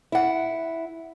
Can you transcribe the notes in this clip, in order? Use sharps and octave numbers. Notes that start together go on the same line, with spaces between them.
E4 F#5